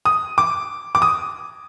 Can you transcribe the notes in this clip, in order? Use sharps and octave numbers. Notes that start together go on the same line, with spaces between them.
D#6
D6
D6
D#6